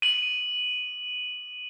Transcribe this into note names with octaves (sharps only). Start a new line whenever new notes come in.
D#7 F#7